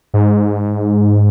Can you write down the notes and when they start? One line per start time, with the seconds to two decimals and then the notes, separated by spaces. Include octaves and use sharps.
0.14 G#2